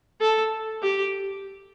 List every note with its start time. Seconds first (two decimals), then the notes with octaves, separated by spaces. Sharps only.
0.21 A4
0.83 G4